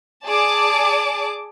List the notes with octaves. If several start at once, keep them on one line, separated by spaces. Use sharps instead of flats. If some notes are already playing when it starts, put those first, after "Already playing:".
G#4 D5 A5 D6